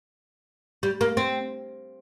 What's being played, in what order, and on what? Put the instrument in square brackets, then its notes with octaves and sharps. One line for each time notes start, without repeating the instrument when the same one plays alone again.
[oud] G3
A#3
C4